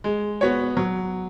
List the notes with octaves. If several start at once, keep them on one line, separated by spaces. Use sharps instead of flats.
G#3
B3 F#4 C#5
F#3